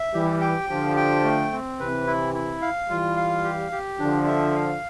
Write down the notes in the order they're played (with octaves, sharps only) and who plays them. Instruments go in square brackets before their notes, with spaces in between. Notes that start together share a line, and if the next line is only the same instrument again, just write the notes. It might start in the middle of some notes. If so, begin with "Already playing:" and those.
Already playing: [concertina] E5
[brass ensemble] E3 G3 [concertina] G4
[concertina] G5
[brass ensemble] D3 F3 [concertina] G4
[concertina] G5
A3
C4
[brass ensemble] C3 E3 [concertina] B4
[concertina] E4
E4
F5
[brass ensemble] E3 G3 [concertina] F4
[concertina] F5
G4
G4
[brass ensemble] D3 F3 [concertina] D4
[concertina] E5
F5